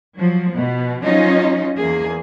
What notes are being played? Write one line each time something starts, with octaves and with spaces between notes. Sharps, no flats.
F3 F#3
B2 B3
F3 F#3 C#4 D#4 F4 D#5
E2 A#3 G#4